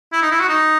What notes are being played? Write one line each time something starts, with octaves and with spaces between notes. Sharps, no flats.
E4
D#4
E4
F#4
D#4